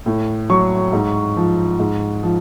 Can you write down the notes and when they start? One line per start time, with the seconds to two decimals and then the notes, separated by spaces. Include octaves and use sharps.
0.06 A2
0.50 F#3 C#6
0.93 G#2
1.36 F3
1.79 G#2
2.23 F3